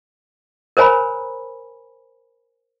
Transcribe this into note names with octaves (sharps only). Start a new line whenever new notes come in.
A#4 C5 C#5 G#5 A#5 B5